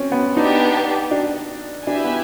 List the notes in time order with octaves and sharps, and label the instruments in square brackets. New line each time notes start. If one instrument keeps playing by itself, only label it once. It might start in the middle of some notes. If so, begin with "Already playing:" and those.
Already playing: [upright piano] C4 C#4
B3
[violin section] B3 D4 G4 B4 [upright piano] D#4
[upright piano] D4
[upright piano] D4 [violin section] E4 G4 B4 E5 G#5
[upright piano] B3